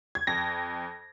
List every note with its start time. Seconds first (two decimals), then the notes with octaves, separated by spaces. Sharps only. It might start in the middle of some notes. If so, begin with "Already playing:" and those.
0.15 G#6
0.27 F2 A#6